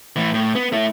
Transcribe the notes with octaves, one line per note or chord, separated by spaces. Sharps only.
A2 E3
A2
B3
A3 E4